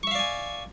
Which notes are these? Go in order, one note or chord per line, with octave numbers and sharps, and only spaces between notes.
D5 E5 F5 G#5 C#6